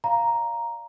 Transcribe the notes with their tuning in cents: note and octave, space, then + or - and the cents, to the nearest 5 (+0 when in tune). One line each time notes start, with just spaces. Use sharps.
D5 +0 F5 -10 A#5 +5